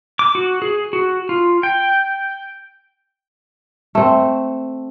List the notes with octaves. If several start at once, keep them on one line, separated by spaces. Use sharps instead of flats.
D6
F#4
G#4
F#4
F4
G5
A3 C4